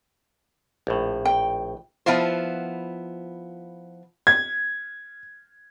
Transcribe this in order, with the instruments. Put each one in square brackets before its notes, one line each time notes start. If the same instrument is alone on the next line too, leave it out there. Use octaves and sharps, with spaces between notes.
[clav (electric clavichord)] A#1 A2
[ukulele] G5
[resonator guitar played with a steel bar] F3 B3 E4 F4 C5
[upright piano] G#6